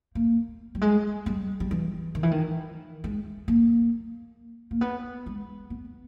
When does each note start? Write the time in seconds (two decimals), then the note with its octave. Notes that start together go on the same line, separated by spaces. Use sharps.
0.15 A#3
0.75 G3
0.81 G#3
1.26 G3
1.60 G3
1.71 E3
2.15 D#3
2.23 E3
2.31 D#3
3.04 G#3
3.48 A#3
4.71 A#3
4.81 B3
5.26 G#3
5.70 B3